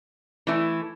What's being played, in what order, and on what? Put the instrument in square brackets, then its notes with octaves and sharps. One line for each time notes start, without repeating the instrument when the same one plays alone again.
[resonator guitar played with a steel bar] E3 A3 E4